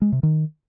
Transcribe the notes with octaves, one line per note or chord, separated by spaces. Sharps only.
G#3
C3
D#3